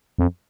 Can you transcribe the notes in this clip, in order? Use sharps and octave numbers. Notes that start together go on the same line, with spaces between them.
F2